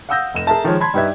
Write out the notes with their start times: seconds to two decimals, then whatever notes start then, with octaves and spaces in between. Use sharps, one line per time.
0.09 F5 F#5 D#6 E6 G6 A#6
0.34 F1 E7
0.47 G#4 A#4 E5 A5
0.64 D#3 F3 G#3 G#4 C#5
0.80 A5 B5 C6 G#6
0.94 G2 D#4 G4 B4 E5 G#6